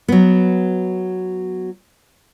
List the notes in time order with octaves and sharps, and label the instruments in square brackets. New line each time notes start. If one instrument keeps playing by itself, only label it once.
[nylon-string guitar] F#3 B3